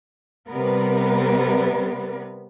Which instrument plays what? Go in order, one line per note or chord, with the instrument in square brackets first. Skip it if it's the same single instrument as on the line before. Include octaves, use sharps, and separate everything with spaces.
[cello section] C3 G3 B3 A#4 B4